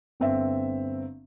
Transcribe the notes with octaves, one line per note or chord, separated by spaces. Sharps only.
G1 C4 E5